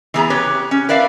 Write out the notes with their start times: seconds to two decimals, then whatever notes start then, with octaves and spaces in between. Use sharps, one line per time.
0.14 E3 B3 G#4 A#5
0.30 G4 B4 C#5
0.71 C#4
0.89 A#4 B4 D5 E5 F5